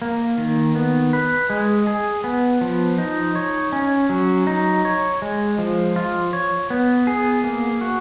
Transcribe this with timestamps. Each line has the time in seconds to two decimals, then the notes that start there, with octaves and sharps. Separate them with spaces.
0.02 A#3
0.38 D#3
0.75 B3
1.13 B4
1.50 G#3
1.87 G#4
2.24 B3
2.61 F3
2.98 D#4
3.36 C#5
3.73 C#4
4.09 F#3
4.47 D#4
4.85 C#5
5.22 G#3
5.58 F3
5.96 F4
6.33 C#5
6.70 B3
7.07 G#4
7.44 A#3
7.81 F#4